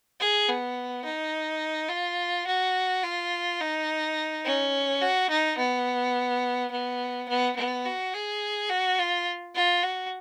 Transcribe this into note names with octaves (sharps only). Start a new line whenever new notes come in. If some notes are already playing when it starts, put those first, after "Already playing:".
G#4
B3
D#4
F4
F#4
F4
D#4
C#4
F#4
D#4
B3
B3
B3
B3
F#4
G#4
F#4
F4
F4
F#4